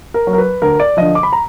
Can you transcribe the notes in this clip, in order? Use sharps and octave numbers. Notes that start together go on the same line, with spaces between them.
A#4
F#3
A#4
B4
D2 A#4
D5
D3 F3 D#5
D6
B5
A#5